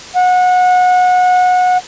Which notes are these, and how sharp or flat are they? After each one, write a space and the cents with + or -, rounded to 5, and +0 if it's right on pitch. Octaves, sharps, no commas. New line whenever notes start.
F#5 -25